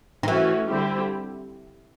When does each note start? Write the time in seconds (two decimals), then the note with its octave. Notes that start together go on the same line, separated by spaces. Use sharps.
0.23 D#3
0.28 E3 A3 C#4 F#4
0.67 D3 G3 C4 E4 G4